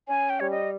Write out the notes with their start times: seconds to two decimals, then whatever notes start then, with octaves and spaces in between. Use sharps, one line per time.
0.08 C#4 G#5
0.30 G5
0.40 G3 C#5
0.51 D#5